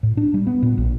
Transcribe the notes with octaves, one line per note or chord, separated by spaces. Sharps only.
A2
D4
G3
B3
A#2
A#1